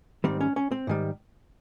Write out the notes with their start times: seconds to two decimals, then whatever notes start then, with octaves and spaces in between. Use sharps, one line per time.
0.24 G#2 D#3 G3 C4
0.41 C#4
0.56 C#4
0.72 C4
0.87 G#2 D#3 G3